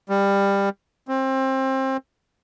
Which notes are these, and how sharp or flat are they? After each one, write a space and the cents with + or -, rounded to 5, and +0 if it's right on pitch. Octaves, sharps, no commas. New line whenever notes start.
G3 +20
C4 +25